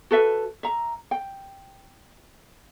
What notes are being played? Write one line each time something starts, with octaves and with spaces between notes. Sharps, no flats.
F#4 A4 B4 E5
E5 A#5
G5